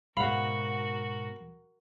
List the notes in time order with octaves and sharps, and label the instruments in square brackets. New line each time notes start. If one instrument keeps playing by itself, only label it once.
[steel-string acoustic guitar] G#2 B2 [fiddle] F#4 A#4 [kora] F5 F#5 [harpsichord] B5